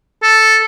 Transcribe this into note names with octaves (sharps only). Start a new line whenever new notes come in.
A4